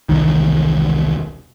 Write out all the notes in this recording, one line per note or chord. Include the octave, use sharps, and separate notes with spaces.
E1 C2 D#3